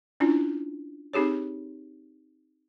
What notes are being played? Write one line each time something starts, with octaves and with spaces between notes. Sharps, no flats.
C#4 D4 E4 F4
C4 D#4 G4 G#4 C#5